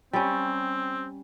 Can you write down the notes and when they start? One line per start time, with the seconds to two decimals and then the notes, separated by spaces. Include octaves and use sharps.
0.13 G3 C4 C#4